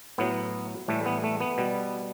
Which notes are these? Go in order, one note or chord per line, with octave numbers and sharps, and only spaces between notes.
A2 F#3 B3
A2 E3 G3 A3
B3
A3
B3
B2 G3